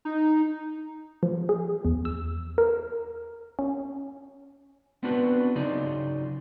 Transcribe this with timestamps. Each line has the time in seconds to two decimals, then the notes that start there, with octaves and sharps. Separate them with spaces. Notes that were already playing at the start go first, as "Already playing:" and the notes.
0.05 D#4
1.23 F3
1.49 G#4
1.85 E2
2.05 E6
2.58 A#4
3.59 C#4
5.03 B3 C4 D4 F4 F#4 B4
5.55 C#3 F#3 D#4 F4 G#4 D5